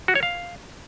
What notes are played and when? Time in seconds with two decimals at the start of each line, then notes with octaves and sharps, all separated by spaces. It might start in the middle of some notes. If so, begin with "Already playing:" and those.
0.08 F#4
0.15 C#5
0.23 F5